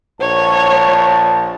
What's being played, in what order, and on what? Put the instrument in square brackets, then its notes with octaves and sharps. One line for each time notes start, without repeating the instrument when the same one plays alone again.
[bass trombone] A#1 [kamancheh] C#5 [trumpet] A5